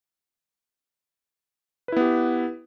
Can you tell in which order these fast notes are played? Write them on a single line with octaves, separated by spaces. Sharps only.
B4 E4 B3 G4